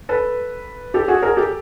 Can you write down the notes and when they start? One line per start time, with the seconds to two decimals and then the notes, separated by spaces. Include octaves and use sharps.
0.09 A4 B4
0.94 G4 A4
1.08 F#4 G#4
1.23 G#4 A#4
1.36 G4 A4